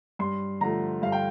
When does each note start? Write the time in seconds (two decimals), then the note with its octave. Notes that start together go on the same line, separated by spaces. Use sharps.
0.19 G2 C6
0.61 D3 F3 A3 A#5
1.02 G2 F5
1.12 G5